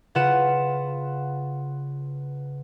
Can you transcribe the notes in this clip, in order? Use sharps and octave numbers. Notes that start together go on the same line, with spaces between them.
C#3 F4 B4 F#5 E7